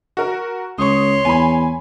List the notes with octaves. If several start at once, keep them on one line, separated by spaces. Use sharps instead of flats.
F#4 A#4
C#2 C#5 C6 C#6 D#6
E2 G#5 B5